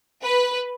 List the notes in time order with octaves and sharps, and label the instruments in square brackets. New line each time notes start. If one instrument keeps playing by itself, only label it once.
[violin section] B4